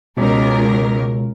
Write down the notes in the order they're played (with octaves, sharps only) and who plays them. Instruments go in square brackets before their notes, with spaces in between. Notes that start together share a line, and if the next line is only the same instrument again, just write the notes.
[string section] C#2 A#4 [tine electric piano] B2